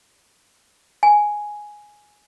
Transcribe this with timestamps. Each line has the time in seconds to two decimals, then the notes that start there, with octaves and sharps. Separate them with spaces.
1.03 G#5